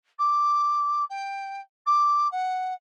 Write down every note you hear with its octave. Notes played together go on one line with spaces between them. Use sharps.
D6
G5
D6
F#5